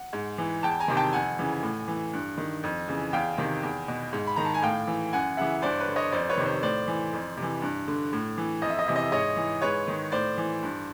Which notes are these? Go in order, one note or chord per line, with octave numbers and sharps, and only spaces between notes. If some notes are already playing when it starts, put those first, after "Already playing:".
Already playing: F#5
G#2
E3
E2 G5 A5
G#5 A#5
C3 D#3
G5 A5
F2 F#5 G#5
C#3 E3
A2
E3
G2
D#3
F2
C#3 E3
E2 F5 G5
C3 D#3
E2
B2
G#2
B5
D#3 A#5
A5
G#5
A2 F5 G5
E3
F#2 F#5 G#5
C#3 E3 E5 F#5
G2 C5 D5
B4 C#5
D3
C#5 D#5
F2 C5 D5
B4 C#5
C3 D#3
C5
A2 C5 D5
E3
F2
C3
E3
G2
D3
A2
E3
F2 D#5
E5
D#5
C3 E3 E5
D#5
E5
G#2 C#5 D#5
E3
G#2 B4 C#5
D#3
A2 C5 D5
E3
G2